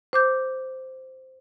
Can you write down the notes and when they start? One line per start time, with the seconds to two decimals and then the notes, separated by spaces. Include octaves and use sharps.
0.13 C5 D6 G6